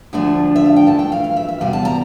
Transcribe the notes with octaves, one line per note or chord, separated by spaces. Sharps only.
D2 D3 F3 A3 D4
E5
F5
G5
F2 E3 A3 A5
G5
F5
F5
E5
E5
E2 C3 G3 F5
A5
A#5